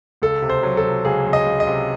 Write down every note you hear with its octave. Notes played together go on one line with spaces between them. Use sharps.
C#2 A4
C3
C5
F#3
A4
C3
C#2 G#4
C#2
D#5
C#2
D#5
C3